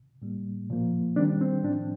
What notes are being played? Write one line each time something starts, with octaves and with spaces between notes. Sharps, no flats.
A2 G3 A#3
A#2 F3 A#3
D#3 G3 C4 D4
C4
A2 F3 C4 D4